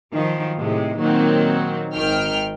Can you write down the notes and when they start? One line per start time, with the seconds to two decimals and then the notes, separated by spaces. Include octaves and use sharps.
0.13 D#3 F3 F#3
0.57 A2 C3 G#3
1.00 A#2 D#3 F#3 A#3 C4
1.94 G#1 D#3 G5 F6